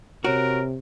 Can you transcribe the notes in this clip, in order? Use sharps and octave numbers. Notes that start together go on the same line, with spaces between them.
C3 F#4 A#4 C#5 D7